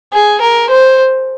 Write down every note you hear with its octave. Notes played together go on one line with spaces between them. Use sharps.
G#4
A#4
C5